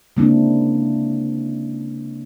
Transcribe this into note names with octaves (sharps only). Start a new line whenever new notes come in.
C#3 G#3 A#3 C4 D4 E4